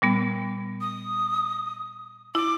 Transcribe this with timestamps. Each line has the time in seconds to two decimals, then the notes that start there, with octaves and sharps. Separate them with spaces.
0.02 A#2 G3 B3
0.81 D#6
2.35 E4 D6